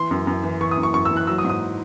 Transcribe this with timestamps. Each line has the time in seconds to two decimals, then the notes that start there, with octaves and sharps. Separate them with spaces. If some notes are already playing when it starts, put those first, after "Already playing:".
Already playing: E3 C6
0.11 F#2
0.27 F#2
0.44 E3
0.61 E3 C#6
0.71 D#6
0.77 F#2
0.83 C#6
0.94 F#2 C#6
1.05 E6
1.11 E3
1.16 F#6
1.27 F#3 E6
1.38 D#6
1.44 G#2
1.50 D#6